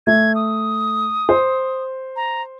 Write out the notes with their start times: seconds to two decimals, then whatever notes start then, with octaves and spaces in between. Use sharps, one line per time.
0.07 A3 G#6
0.35 D#6
1.29 C5
2.16 A#5